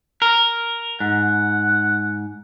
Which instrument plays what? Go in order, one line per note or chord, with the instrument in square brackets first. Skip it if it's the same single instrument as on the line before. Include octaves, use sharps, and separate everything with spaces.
[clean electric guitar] A#4
[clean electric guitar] G#2 [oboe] F#5